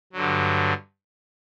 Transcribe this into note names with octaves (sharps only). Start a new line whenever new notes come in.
G2 D3 F#3